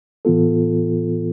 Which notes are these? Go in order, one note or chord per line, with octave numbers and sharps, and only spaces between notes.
A2 E3 B3 F4 A4